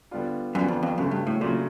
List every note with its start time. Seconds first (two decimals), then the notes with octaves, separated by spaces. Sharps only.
0.11 D3 G3 B3 D4 F4
0.55 F#2 D3 G3 B3 D4 F4
0.68 F2
0.83 F2
0.98 F#2 C#3 F#3 A3
1.11 G2
1.27 A2
1.41 A#2 C#3 F#3 A3